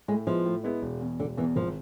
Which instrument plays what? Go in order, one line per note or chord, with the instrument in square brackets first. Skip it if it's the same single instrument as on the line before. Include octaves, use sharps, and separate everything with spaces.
[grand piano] A2 [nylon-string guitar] G#3
[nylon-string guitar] F3 [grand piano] G#3 B3 E4
[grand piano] A2
G#3 B3 E4
E1
E2 B2
[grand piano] E1 [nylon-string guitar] D3
[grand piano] E2 [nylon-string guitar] E3
[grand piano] B2
[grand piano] G#1 [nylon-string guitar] F3